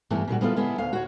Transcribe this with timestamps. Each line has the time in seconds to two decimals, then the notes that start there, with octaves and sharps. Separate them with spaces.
0.10 G2 E3 A3 B3 E4
0.28 A#2 D3 G3 F#4
0.41 G3 B3 E4 F4 G4 A4
0.56 D3 G#3 B3 E4 G4
0.78 D2 F5
0.93 F#4 C#5